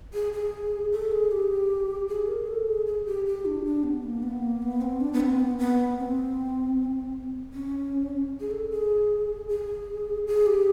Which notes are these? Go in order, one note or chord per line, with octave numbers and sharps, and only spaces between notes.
G#4
G#4
A4
G#4
G4
G#4
A#4
A4
G#4
G#4
G4
G4
D4
D4
B3
A#3
B3
A#3
B3
C4
D4
B3
C4
B3
B3
C4
C#4
G#4
A4
G#4
G#4
G#4
G4